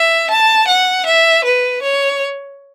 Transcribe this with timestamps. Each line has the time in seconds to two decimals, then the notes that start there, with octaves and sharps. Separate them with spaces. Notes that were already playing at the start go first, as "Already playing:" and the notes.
Already playing: E5
0.31 A5
0.68 F#5
1.06 E5
1.45 B4
1.82 C#5